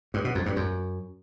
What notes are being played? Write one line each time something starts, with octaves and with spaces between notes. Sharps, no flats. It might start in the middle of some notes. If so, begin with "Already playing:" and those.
G2
B2
F2
G2
F#2